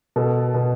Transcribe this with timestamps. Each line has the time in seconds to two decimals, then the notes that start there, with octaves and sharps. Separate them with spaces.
0.16 B2 A4
0.54 B2